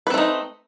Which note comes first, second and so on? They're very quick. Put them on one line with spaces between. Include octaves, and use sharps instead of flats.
B4 C4 A3 D#4